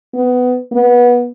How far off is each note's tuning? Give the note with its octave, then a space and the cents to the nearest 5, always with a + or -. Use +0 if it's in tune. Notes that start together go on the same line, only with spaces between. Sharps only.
B3 +15
B3 -20